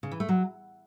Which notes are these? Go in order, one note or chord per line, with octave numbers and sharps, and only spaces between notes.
C#3
E3
A3
F#3